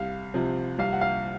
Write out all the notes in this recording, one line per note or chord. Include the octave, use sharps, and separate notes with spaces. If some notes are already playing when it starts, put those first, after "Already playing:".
Already playing: C2 F5
C3 F3
C2 F5
F#5
F5